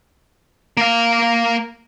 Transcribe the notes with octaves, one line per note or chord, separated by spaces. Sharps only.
A#3 F5